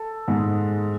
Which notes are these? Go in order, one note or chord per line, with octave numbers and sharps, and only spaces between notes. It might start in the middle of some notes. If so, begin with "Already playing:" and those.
Already playing: A4
G#2 G#3